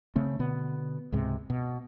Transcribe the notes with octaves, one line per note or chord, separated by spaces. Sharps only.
C#3 A3 C4
B2 D3 B3
C#2 G#2 C3 G#3
B2